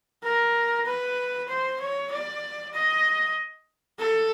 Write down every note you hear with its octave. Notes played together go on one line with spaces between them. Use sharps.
A#4
B4
C5
C#5
D5
D#5
A4